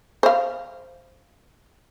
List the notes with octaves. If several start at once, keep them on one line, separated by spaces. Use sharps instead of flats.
C5 F5